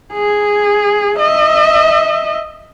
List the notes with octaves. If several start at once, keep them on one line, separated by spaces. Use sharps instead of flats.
G#4
D#5 E5